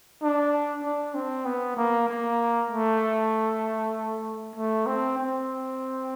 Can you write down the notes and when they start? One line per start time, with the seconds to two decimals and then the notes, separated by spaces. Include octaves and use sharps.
0.22 D4
0.84 D4
1.15 C4
1.45 B3
1.77 A#3
2.08 A#3
2.70 A3
4.56 A3
4.86 C4
5.18 C4